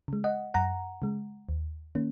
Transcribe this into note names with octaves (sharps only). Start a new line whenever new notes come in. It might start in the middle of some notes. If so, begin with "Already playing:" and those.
C#3 G#3
D#5 F#5
F#2 F#5 A#5
C#3 G#3
D#2
D#3 A#3 C#4